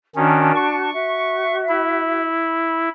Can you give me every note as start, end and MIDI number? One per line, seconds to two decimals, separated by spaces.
0.16 0.52 51
0.16 0.52 61
0.16 0.91 62
0.16 0.91 66
0.16 0.91 81
0.56 1.56 85
0.94 2.27 66
0.94 2.27 76
1.69 2.89 64